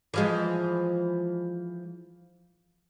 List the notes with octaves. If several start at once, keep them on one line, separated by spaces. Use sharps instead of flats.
E3 F3 G#3